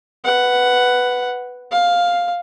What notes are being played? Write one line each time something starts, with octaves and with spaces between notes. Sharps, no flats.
B4 F#5
F5